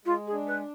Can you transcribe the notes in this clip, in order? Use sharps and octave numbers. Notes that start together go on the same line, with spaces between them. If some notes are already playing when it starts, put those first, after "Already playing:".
G#3 F4
G#4
D4
B4